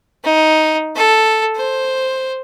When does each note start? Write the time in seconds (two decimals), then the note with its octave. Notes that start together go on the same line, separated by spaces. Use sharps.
0.24 D#4
0.96 A4
1.56 C5